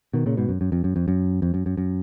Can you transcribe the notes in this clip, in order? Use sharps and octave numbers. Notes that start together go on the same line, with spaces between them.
B2 D#3
A#2 C#3
G#2 B2
F#2
F#2
F2
F#2
F2
F#2
F2
F#2
F#2
F#2